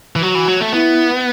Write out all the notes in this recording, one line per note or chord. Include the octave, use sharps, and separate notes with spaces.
E3
F#3 F#4
E3
F#3
A3
B3 E4